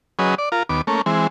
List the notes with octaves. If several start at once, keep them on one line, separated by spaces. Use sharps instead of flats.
F#3 C#4 G#4 B4 D#5
D5
F4 A#4
D#2 B3 D6
A3 A#3 C#4
E3 G#3 C4